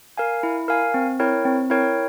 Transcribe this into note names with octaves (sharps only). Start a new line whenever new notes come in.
A#4 F5 G#5
E4
A#4 F5 G#5
C4
E4 A#4 C#5 G5
C4
E4 A#4 C#5 G5